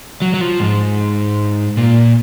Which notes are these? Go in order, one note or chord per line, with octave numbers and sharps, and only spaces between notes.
F#3
F#3
F3
G#2
A#2